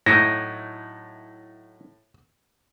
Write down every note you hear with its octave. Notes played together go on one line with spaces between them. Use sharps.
A2 F#3 D#4 E4 A#6